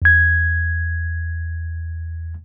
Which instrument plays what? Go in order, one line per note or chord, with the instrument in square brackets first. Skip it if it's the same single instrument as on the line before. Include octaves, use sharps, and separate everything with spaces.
[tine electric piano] E2 G#6